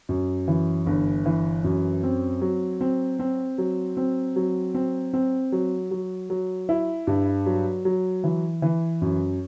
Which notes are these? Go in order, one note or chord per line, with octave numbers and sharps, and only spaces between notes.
F#2
E3
G1
E3
F#2
C4
F#3
C4
C4
F#3
C4
F#3
C4
C4
F#3
F#3
F#3
E4
G2
F#3
F#3
E3
E3
F#2